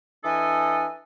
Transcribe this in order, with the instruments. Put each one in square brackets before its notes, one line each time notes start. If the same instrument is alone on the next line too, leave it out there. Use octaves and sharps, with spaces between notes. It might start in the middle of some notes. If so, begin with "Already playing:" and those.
[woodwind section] E3 D4 A4 D#5 G#5